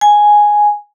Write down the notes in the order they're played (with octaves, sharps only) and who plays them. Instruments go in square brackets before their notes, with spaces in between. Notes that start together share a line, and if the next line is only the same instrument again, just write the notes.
[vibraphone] G#5